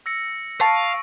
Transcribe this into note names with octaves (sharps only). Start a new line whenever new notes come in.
E6 A#6 C#7
F5 A5 C#6 D7